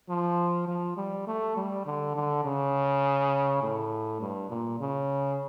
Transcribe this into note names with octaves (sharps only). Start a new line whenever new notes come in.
F3
F3
G3
A3
G3
D3
D3
C#3
A2
G2
A#2
C#3